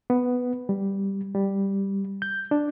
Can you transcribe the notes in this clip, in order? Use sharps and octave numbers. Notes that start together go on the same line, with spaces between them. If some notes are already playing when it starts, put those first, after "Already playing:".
B3
G3
G3
G6
D4